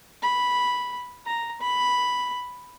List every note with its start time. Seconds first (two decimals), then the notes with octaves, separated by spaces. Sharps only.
0.23 B5
1.26 A#5
1.61 B5